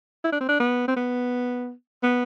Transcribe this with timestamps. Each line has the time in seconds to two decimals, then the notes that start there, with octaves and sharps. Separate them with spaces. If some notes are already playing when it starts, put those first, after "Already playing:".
0.24 E4
0.32 D4
0.40 C4
0.49 D4
0.60 B3
0.87 C4
0.96 B3
2.03 B3